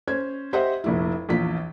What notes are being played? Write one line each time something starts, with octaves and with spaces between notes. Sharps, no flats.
C#4 C5 G#6
G4 C5 D#5 E5 F#5
F1 A#1 E4
A#1 E2 F4 B6